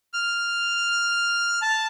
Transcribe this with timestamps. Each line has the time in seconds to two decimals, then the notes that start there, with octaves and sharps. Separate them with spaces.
0.14 F6
1.62 A5